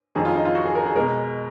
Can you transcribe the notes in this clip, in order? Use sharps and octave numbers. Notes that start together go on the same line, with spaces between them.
F2 D#3 F#3 G#4
F4
D#4
F4
F#4
G#4
A#4
G#4
B2 G#3 A#4